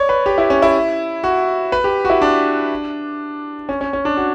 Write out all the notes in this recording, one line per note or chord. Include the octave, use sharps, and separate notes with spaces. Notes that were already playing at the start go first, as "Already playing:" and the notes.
Already playing: C#5 D5
B4
G4
E4
C#4
E4
F#4
B4
G4
F#4
E4
D4
C#4
C#4
C#4
D4
F#4